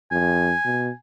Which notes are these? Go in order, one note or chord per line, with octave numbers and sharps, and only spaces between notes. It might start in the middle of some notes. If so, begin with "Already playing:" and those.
F2 G#5
B2